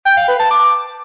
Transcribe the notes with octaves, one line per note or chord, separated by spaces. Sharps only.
G5
F5
B4
A5
D6